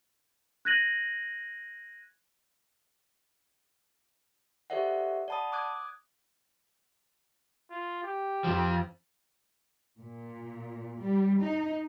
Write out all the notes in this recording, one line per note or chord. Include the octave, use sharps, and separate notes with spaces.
F#6 G#6 A#6 D#7 F#7
G4 A4 C5 D5 E5 F#5
D5 F#5 A5 B5 D#6
D6 D#6 F#6 G#6
F4
G4
F2 F3
A#2
G3
D#4